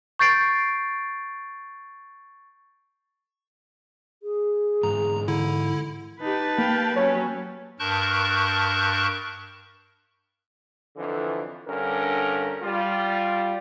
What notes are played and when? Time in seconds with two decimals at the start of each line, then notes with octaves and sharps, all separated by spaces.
0.19 C#6 G6 A6 C7 D7
4.23 G#4
4.83 G#2 E3 A#5
5.28 D3 E4
6.21 D#4 G4 B4 A5
6.58 A#3 F5 G5
6.96 F#3 C#4 C#5
7.79 G2 A#4 A5 C#6 F#6 G6
10.97 F2 D3 E3
11.68 G2 D3 C#4 A#4
12.63 G3 F4